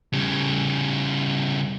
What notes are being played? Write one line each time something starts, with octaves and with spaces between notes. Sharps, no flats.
C#3 G3